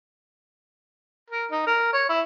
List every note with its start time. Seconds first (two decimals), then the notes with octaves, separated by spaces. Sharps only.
1.30 A#4
1.51 D#4
1.67 A#4
1.93 C#5
2.09 E4